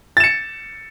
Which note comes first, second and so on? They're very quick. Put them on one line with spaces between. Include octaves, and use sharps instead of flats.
A6 E7 C#7